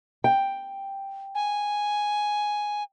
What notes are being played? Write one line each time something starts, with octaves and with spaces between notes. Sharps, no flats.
G5
G#5